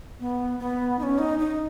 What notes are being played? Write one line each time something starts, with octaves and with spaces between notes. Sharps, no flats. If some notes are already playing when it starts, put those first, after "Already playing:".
B3
B3
D#4
C#4
D#4
D#4